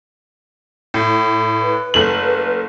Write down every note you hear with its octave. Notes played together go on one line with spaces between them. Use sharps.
A2
B4
F#1 A3 F#7